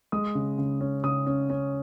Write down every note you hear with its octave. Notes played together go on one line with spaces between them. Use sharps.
G#3 D#6
C#3
C#3
C#4
C#3 D#6
C#4
C#4